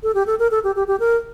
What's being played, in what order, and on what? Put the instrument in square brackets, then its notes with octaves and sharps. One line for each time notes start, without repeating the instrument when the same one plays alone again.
[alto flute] A4
G4
A4
A#4
A4
G4
G4
G4
A#4